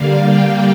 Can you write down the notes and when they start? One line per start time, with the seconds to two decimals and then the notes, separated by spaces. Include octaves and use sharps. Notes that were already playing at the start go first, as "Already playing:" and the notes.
Already playing: D3 G3 A#3 D4 F5
0.23 G5